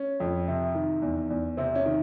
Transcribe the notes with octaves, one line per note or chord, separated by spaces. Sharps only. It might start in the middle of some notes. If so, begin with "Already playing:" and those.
Already playing: C#4
F2
C3
D#3
E2
E2
C3 C4
C#4
D#3